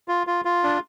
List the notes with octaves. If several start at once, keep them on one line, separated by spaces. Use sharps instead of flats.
F4
F4
F4
D4